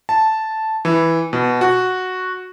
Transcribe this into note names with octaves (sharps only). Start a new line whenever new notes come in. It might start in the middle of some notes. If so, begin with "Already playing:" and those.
A5
E3
B2
F#4